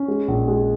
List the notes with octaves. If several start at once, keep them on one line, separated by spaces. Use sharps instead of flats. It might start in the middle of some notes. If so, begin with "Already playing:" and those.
Already playing: C#4
G#3
A#1
G#3